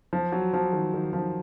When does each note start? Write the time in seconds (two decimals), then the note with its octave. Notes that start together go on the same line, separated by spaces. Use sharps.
0.13 F3
0.32 F#3
0.53 F3
0.73 D#3
0.94 D#3
1.13 F3